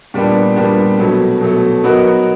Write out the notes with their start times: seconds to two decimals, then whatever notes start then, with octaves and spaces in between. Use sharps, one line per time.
0.14 A#2 G3 B3 D4
0.56 A#2 G3 B3 D4
0.99 B2 F#3 A3
1.41 B2 F#3 A3
1.83 F#3 B3 D#4 F#4 A#4